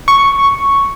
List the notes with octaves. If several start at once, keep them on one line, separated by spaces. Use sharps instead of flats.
C#6